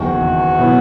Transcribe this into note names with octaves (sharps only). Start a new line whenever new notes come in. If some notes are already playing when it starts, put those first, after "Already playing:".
Already playing: F#1 E2 D#3 F#4
B2 F#3 B3 E4